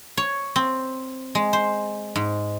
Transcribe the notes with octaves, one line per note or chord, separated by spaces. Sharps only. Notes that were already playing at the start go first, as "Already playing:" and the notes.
C#5
C4
G#3
C5
G#2